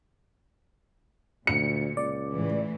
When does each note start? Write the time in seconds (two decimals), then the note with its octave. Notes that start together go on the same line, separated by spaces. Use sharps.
1.47 D2 A#2 C#7
1.97 C#2 D5
2.33 A2 E3